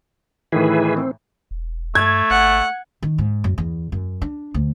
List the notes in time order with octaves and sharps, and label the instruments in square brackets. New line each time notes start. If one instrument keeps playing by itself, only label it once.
[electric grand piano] A2 D#3 E3 [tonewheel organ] E4 G#4 B4
[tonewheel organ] C4
[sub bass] E1
[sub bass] G2 [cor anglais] A3 [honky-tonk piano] G#6
[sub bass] G#1 [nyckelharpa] F#5
[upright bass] D#3
G#2
F#2
E2
F#2
D4
D2